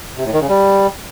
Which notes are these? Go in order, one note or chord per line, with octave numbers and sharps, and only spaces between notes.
C3
A2
D#3
C#3
G3